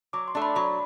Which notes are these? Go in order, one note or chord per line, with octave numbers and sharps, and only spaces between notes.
F#3 D6
C6
A3 D4
B5
F#3 B5